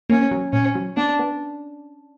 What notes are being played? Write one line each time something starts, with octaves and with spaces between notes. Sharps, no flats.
A#3 C#4
F#3
A#2 C#4
F#3
B3 D4
B3